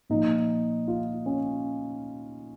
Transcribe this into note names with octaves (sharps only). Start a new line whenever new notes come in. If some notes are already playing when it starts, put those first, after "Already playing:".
A#2 F3 D#4
F4
C#4